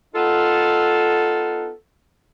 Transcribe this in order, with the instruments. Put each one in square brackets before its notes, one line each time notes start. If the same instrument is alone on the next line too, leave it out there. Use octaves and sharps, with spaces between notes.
[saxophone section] B3 D#4 F4 A4